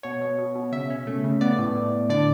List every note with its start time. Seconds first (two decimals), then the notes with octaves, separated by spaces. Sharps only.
0.03 B2 C#5
0.21 B2
0.38 B2
0.55 B2
0.72 C#3 E5
0.90 C#4
1.07 A3
1.24 C#3
1.41 B3 D5
1.58 A2
1.75 A2
1.92 A2
2.10 D3 D5